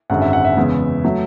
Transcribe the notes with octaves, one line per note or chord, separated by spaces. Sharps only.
G#1 F#2 D3 G#3 F#5
E5
F#5
E5
E2 C#3 G#3 B3
F#3 A3